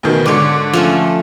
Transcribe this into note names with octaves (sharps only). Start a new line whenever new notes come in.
D2 B2 D#3
G#2 D3 C#5 D5
F3 A3 C#4